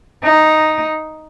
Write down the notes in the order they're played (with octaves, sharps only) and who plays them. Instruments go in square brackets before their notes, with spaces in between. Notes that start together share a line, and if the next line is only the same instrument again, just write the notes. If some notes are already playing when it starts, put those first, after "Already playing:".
[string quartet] D#4